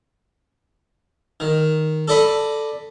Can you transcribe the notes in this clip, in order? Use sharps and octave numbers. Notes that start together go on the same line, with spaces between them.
D#3
A4 D5 D#5 B5